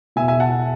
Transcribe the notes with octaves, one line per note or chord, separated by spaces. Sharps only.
E1 E2 B2 E5 G#5
E5 G#5
F#5 A5